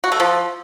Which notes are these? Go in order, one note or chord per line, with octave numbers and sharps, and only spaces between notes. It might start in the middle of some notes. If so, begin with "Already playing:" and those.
F#4
A3
F3